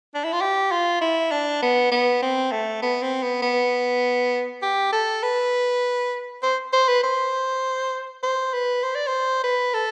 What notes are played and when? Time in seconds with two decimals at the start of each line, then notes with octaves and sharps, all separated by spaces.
0.15 D4
0.24 E4
0.33 F4
0.42 G4
0.72 F4
1.01 E4
1.31 D4
1.62 B3
1.92 B3
2.22 C4
2.52 A3
2.82 B3
3.02 C4
3.23 B3
3.42 B3
4.63 G4
4.93 A4
5.23 B4
6.43 C5
6.73 C5
6.88 B4
7.04 C5
8.23 C5
8.53 B4
8.84 C5
8.95 D5
9.07 C5
9.44 B4
9.74 A4